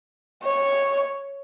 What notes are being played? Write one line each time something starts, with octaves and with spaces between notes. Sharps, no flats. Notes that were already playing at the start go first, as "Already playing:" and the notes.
C#5